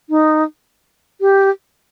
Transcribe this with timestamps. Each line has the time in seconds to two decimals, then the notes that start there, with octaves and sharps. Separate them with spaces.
0.10 D#4
1.21 G4